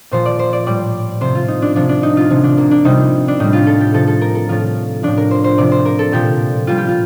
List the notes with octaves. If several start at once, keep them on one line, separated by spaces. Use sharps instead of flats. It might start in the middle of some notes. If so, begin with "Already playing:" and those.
A#2 F3 C5
D5
C5
D5
A2 G3 D5
C3 F3 C5
F4
D#4
D4
C3 F3 D4
D4
D#4
F4
C3 F3
D4
A#3
D4
C3 G3 D#4
D4
A2 G3 D#4
F4
A4
G4
C3 F3 A4
A4
A#4
A4
A2 F3 F4
A2 F3 D4
A#4
C5
C5
C3 F3 D5
C5
A#4
A4
A#2 F3 G4
A#2 G3 F4
G4
F4